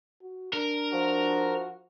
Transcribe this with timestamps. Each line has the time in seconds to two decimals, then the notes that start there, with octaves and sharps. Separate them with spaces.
0.22 F#4
0.53 D4 A#4
0.92 F3 F#4